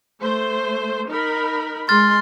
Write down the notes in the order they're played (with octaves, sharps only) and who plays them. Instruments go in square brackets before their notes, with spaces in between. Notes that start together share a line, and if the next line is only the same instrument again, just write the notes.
[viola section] A3 C5
D#4 A#4 B5
[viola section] G#3 [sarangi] C6 [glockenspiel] F6 A6